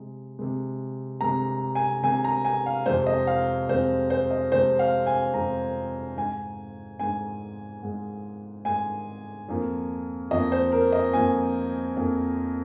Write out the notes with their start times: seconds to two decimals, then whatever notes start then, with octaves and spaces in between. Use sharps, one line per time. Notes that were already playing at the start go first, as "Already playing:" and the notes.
Already playing: C3 G#3
0.39 C3 G#3
1.21 C3 G#3 A#5
1.75 G#5
2.03 C3 G#3 G#5
2.24 A#5
2.45 G#5
2.66 F5
2.86 F2 C3 G#3 C5
3.07 D#5
3.27 F5
3.69 F2 C3 G#3 C5
4.10 C5
4.31 D#5
4.52 F2 C3 G#3 C5
4.79 F5
5.06 G#5
5.34 F2 C3 G#3 A#5
6.17 G#2 G#3 G#5
7.00 G#2 G#3 G#5
7.83 G#2 G#3
8.65 G#2 G#3 G#5
9.49 F2 F3 A#3
10.31 F2 F3 A#3 D#5
10.52 C5
10.72 A#4
10.93 D#5
11.13 F2 F3 A#3 G#5
11.96 F2 F3 A#3